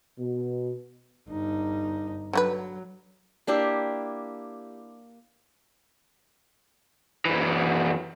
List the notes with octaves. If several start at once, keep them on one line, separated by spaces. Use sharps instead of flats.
B2
G1 D#4
D3 F#3 F#4 B4
A#3 D4 E4 G4
F#2 E3